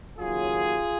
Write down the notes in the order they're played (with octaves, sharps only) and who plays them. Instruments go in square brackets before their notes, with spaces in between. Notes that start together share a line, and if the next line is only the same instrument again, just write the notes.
[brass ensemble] D#2 C#3 F#3 F4 G#4